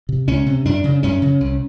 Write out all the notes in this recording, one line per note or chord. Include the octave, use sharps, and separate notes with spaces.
C3
C#2 C#4
C3
F#2 D4
C#3
F#2 C#4
C#3
C2